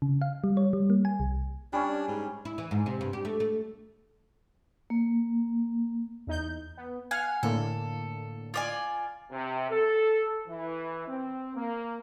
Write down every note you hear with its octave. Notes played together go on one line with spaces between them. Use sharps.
C#3
F5
G3
C#5
G3
A#3
G#5
C2
G3 C#4 D4
G#2
E4
E3
G#2
C3
G2
G4
A3
A3
A#3
E2 D#4 G6
B3
F5 F#5 G#5 F6
A2 D3 A#3 A4
F4 D5 G#5
C3
A4
E3
C4
A#3